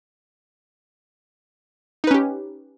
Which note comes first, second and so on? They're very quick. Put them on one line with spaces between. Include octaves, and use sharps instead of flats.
D#4 B4 C#4 G4